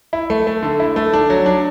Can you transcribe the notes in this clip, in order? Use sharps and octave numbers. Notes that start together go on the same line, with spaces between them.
E4
A3
A3
D3
E4
A3
D4
F#3
D4